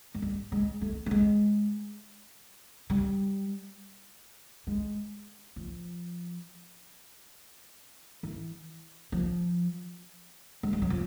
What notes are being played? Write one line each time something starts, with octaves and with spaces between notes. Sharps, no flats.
G#3
G3
G#3
A3
A3
G#3
G3
G#3
F3
E3
F3
G#3
G3
F#3
F3